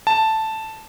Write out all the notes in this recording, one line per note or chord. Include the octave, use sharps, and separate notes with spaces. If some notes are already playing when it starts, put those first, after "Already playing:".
A5